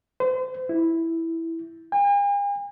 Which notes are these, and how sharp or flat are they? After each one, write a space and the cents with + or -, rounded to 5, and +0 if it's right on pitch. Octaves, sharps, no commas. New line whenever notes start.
C5 -40
E4 -5
G#5 -45